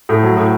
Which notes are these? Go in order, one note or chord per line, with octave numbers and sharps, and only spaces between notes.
A2
F#3
A2